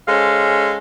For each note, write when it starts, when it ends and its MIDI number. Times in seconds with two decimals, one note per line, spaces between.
0.08 0.78 56
0.08 0.78 61
0.08 0.78 69
0.08 0.78 72
0.08 0.78 77